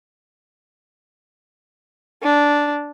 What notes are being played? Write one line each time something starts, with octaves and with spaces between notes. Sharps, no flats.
D4